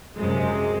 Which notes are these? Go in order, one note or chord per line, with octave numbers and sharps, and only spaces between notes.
F#2 C3 G#3